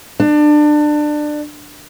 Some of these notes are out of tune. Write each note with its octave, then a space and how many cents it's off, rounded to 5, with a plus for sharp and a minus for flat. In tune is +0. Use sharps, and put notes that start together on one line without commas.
D4 +25